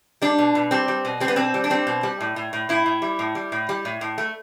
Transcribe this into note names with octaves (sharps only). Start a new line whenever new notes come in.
G3 D4
B2
B2
G3 C4
G3
B2
G3 C4
B3
B2 C4
G3
D4
G3 C4
B2
G3
A2
A2
A2
A2 E4
A2
G3
A2
G3
A2
G3
A2
A2
A3